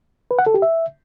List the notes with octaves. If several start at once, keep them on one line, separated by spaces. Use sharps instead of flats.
B4
F#5
A4
G4
E5